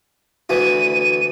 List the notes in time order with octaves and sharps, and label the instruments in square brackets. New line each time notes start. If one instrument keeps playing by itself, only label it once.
[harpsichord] D2 E3 [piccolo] D#7